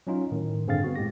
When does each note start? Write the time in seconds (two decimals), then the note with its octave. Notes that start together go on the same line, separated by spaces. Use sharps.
0.07 F#3 C#4 D#4 F4
0.32 A2 D#3
0.67 G2 D3 C4 G#4 F5 A6
0.84 B3 F#4
0.96 A2 G#3 G4 A#6